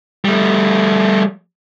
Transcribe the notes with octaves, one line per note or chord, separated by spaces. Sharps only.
G3 A3